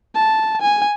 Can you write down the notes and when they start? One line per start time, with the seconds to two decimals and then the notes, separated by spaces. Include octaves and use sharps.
0.15 A5
0.62 G#5